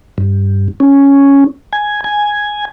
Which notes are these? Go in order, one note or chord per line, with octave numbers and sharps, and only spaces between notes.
G2
C#4
G#5
G#5